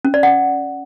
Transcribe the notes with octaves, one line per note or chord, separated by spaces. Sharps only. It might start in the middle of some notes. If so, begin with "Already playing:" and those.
C#4
D5
F#5